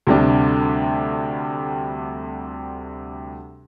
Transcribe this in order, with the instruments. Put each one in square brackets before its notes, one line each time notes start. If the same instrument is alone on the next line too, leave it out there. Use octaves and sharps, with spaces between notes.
[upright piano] D2 C3 G3 D4